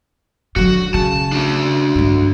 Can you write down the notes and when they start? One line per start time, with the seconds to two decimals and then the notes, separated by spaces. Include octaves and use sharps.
0.56 D3 F#3 F#4
0.94 C#3 A5
1.32 D4 F#4
1.95 G2 D3